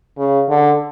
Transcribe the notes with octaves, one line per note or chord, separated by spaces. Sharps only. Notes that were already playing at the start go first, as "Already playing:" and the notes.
C#3
D3